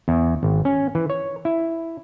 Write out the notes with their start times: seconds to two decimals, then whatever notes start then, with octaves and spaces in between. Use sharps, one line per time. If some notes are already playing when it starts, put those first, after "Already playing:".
0.08 E2
0.43 G#1
0.65 C#4
0.95 E3
1.10 C#5
1.45 E4